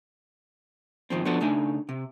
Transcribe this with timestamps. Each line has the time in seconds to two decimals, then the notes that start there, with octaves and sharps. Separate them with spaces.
1.10 G#2 D#3 F3 C4
1.25 F3 B3 D4 F#4 A4
1.40 C#3 A3 D4 D#4 G#5
1.89 C3